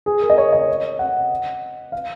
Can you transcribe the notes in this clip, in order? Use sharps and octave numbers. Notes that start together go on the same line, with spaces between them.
G#4
A#4
D#5
C#5
D#5
F#5
F5